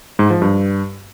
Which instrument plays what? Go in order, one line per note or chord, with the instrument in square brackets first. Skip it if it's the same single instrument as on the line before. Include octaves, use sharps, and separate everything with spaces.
[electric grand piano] G#2
F3
G2